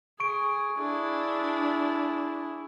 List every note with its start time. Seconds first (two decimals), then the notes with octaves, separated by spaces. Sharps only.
0.20 G#4 C#6 D7
0.78 D4 E4 G#4